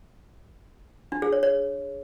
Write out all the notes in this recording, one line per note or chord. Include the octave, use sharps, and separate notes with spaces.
D4
G#4
C#5
C#5